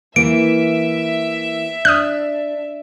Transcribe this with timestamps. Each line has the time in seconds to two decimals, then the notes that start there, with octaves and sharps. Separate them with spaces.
0.16 E3 A#3 E5 D7
1.85 D4 D#6 F6 F#6